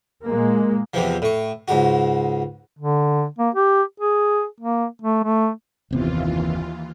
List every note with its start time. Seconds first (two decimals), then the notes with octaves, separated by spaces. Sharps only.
0.25 A#2 G#3 A#3
0.94 E2 C3 E3 F3
1.22 A2 C#6
1.68 C#2 G#2 F#4
2.77 D3
3.38 A#3
3.55 G4
4.00 G#4
4.60 A#3
5.02 A3
5.24 A3
5.91 F#1 D#2 C3 E3 B3 F4